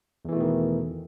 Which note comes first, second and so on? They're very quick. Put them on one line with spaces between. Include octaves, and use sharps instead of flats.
E2 E3 A3 B2 D#3